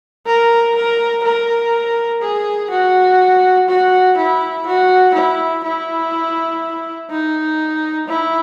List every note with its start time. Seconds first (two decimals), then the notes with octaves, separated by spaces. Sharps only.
0.26 A#4
0.75 A#4
1.24 A#4
2.22 G#4
2.70 F#4
3.69 F#4
4.17 E4
4.66 F#4
5.14 E4
5.64 E4
7.10 D#4
8.08 E4